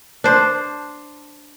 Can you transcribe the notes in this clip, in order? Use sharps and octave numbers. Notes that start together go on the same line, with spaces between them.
D4 C5